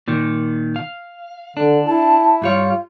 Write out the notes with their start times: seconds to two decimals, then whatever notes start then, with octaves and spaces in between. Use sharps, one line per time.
0.08 A#2 D#3
0.76 F5
1.57 D3 D4
1.86 E4 A5
2.42 G2 G3 F4 C#5